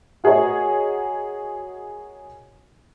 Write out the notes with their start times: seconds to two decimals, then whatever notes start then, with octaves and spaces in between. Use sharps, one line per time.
0.24 F#4 G#4 A#4 C#5 D#5